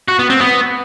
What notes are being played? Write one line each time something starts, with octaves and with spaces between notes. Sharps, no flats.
F#4
B3
C4
B3